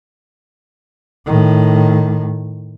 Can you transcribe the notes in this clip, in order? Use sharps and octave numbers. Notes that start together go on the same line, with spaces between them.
A2 D#3